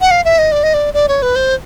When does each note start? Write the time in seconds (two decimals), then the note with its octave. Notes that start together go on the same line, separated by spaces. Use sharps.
0.01 F#5
0.11 F5
0.25 E5
0.38 D#5
0.52 D5
0.63 D#5
0.74 D5
0.94 D5
1.08 C#5
1.22 B4
1.36 C5